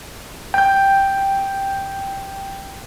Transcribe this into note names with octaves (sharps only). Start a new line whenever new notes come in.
G5 G6